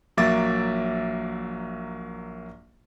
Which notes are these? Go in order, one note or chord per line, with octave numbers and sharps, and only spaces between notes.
A#1 F#3 A#3 E5 D6 A6